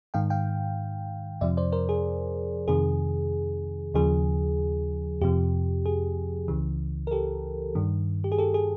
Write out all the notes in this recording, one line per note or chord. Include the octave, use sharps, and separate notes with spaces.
G#2 D#3 F5 G5
F5 G5
F2 C3 F3 D5 E5
C5 D5
A#4 C5
G#4
F2 C3 D#3 G#4
D#2 C#3 F3 G#4
F2 C3 F3 G4
G#4
C#2 C#3 E3
A#4
G4 A4
G2 D#3
G4
G#4
G4 A4
G#4